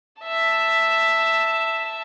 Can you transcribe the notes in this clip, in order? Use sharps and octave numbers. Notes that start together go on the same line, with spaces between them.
E5 A5